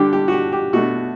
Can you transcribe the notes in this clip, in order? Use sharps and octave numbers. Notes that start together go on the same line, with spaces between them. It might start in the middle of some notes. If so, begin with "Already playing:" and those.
Already playing: D3 G3 D4 G4
G4
F#4
G4
G4
B2 A3 D4 F#4